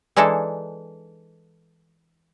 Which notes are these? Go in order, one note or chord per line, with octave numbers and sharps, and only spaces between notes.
E3 G#3 D4 D#4 A4